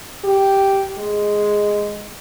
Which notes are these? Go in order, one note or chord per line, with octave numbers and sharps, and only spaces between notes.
G4
G#3